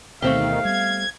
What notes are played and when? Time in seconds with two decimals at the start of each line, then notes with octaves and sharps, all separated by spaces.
0.22 D2 B2 D#3 A3 B3 C4 G4 F5
0.65 G3 B3 G#6